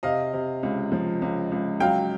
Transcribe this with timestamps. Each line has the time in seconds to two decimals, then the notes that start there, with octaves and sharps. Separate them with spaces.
0.03 C3 D#5 F5
0.33 C3
0.63 C#2
0.92 F3
1.22 C#2
1.52 C#2
1.80 F#3 F5 G5